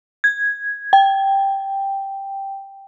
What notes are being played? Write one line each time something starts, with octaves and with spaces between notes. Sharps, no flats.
G#6
G5